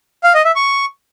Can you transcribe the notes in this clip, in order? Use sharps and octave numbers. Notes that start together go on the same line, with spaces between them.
F5
D#5
E5
C#6